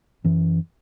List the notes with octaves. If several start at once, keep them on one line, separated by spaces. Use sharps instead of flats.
F#2 E3